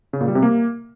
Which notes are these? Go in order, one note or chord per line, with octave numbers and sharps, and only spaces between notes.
C#3
A#2
G3
C3
A#3